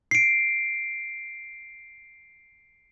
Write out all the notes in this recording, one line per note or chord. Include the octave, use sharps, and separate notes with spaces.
C7 D7